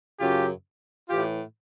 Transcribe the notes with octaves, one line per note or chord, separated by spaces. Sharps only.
F#2 C#3 F#3 F4 G4
A2 E3 F4 G4